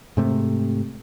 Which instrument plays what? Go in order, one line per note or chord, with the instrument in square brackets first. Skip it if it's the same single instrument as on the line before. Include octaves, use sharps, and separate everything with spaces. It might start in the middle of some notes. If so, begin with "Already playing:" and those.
[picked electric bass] G#2 C3 A3